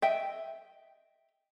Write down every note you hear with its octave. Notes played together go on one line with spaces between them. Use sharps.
D#5 E5 G5